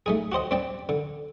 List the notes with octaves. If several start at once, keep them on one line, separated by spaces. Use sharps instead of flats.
A3 D#4 G#4
F#4 G4 C5 D#5
C4 D4 D5 G5 A5
D3